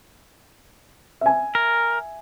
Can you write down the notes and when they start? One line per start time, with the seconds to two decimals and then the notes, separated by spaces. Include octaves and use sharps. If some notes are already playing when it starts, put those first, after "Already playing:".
1.21 E5 G#5
1.55 A#4